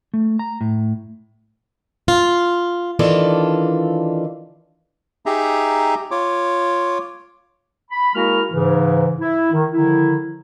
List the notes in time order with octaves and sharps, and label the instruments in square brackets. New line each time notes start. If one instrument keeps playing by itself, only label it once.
[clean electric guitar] A3
A#5
A2
[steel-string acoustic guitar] F4
D#3 E3 D4 F4 A4 D5
[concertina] D#4 G4 G#4 E5 A#5
F4 C#5 D6
[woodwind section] B5
G#3 A#3 E4 F#4 A#4 F6
G#2 C#3 E3
E4
D#3
D3 D#3 F3 E4